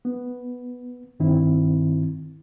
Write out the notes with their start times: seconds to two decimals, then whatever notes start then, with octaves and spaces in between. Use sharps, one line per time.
0.05 B3
1.20 G2 D#3 C4 E4